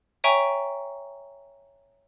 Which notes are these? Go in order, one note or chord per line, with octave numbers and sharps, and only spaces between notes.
C#5 E5 G5 G#5 A#5 C#6